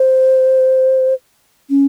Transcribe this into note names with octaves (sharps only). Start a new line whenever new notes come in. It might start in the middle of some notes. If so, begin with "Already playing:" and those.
Already playing: C5
C#4